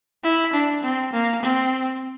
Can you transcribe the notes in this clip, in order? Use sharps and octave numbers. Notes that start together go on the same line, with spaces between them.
E4
D4
C4
A#3
C4